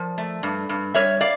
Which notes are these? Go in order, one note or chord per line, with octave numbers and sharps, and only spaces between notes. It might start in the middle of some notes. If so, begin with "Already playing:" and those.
Already playing: F3 A#4 D5
A3
G2
G2
G3 C#5 E5
D5 F5